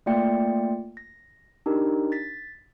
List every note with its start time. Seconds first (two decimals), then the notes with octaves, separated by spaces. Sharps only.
0.06 A3 A#3 F4 D5 G5 C#7
0.97 A#6
1.66 D4 D#4 G4 A#4
2.12 A6 B6